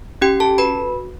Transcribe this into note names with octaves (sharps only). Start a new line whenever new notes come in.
C#4 G4 G5
A4 A5
F#4 B4 B5